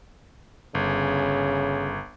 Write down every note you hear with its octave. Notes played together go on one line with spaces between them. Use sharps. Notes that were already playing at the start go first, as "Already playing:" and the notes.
G1 C#3